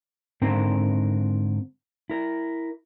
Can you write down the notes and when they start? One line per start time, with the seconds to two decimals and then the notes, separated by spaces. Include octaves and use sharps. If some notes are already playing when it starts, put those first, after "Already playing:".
0.41 G#2 D3 C4 A#4 C5
2.10 E4 A#4